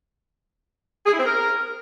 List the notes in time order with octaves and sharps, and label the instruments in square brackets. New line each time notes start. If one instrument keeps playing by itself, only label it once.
[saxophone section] G#4
E4
C4
A#4